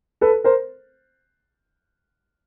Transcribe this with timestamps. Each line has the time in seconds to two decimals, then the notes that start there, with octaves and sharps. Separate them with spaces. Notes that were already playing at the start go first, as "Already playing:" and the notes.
0.21 A4 B4
0.44 A#4 C5